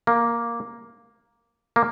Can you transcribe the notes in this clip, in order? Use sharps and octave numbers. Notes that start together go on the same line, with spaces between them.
A#3
A#3